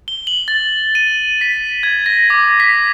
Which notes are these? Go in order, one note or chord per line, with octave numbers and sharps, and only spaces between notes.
G7
F#7
A6
D#7
B6
G#6
A#6
D6
B6